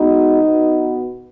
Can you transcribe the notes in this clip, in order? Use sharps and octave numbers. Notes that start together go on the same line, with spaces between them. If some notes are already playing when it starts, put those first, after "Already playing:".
Already playing: B2 G#3 B3 D#4
B2 B3